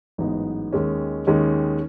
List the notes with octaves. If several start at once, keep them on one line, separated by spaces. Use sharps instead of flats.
A1 G#2 F#3 B3 D#4
D#2 D#3 G#3 C#4
D#2 D#3 G#3 C#4